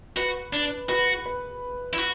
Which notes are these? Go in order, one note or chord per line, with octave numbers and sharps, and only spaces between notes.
F#4 B4
D4
F#4 B4
B4
E4
F#4